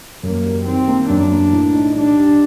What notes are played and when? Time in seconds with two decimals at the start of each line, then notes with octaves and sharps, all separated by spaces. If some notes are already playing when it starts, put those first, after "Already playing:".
0.23 F#2 A#3
0.45 G3
0.66 D#3 C4
0.88 A#3
1.09 F#2 D4
1.31 A#3
1.53 A2
1.74 D#4
1.95 G3 D4
2.17 G4